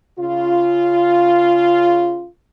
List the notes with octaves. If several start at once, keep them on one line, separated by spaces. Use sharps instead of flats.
C#3 F4